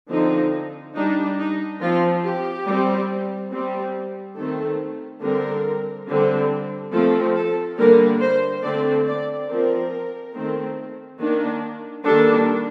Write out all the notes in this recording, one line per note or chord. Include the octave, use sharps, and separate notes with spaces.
D3 F3 C4 D#4
G3 D4 D#4
D#4
F3 C4 F4
G4
G3 C4
G3 C4
D#3 A3 C4 A4
D3 G3 C4 A#4
D3 G3 C4
F3 A3 C4 A4
A4
D3 G3 A#3 D4 A#4
C5
D3 A3 C4 D5
D5
F3 C4 A#4
D#3 A3 C4
D#3 A#3 D4
D#3 G3 A#3 D4 A4